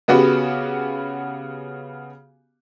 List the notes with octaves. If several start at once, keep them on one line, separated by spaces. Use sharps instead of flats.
C#3 B3 F#4 G4